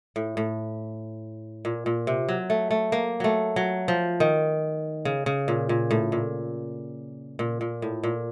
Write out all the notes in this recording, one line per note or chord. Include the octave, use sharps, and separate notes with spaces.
A2
A2
A#2
A#2
C3
F#3
A3
A3
A#3
F#3 A3
F#3
F3
D#3
C#3
C#3
A#2
A#2
A2
A#2
A#2
A#2
A2
A#2